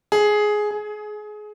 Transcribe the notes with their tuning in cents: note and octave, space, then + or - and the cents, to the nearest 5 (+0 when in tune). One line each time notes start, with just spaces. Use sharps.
G#4 +10
G#4 +25